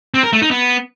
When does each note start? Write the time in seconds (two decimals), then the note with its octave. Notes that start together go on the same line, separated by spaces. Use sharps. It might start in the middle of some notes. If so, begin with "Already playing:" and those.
0.14 C4
0.23 A#4
0.33 A3
0.42 D#4
0.51 B3